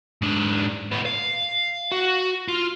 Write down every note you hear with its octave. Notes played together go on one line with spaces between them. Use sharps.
G#2 D4
A2 B3
F5
F#4
F4